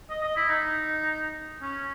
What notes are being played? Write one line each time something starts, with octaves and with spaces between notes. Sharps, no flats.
D#5
D#5
E4
D#4
C#4